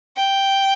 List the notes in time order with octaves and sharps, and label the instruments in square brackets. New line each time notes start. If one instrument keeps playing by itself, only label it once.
[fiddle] G5